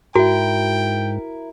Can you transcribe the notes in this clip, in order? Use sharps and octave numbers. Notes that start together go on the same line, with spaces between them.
G#2 E4 F#4 A#4 G5